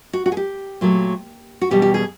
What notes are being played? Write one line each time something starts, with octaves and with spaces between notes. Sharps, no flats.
F#4
F#4
G#4
G4
A#2 F#3 A3
F#4
E2 B2 G3 G4
G4
G#4